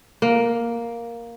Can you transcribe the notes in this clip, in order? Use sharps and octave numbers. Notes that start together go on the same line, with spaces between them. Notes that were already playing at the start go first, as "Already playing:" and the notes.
A#3